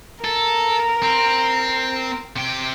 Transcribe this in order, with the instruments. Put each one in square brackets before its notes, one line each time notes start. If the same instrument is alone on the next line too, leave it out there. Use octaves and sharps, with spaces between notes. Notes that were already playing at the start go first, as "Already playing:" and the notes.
[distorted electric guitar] A4 [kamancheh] A#4
[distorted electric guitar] C4
C3 G5